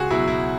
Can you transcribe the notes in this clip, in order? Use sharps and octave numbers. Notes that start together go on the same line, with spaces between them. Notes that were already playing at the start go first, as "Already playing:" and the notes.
Already playing: C#2 F#4 G#4
B2 F#3 E4
E4